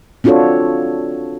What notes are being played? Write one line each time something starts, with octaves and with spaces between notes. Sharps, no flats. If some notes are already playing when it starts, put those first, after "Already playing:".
C4 D4 F4 F#4 A4 C#5